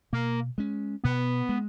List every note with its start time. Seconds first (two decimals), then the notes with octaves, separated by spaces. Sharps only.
0.13 B2 A#3
0.58 G#3 C#4
1.04 B2 B3
1.49 G#3